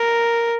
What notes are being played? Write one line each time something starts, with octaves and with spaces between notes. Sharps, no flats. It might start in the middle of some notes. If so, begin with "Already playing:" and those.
Already playing: A#4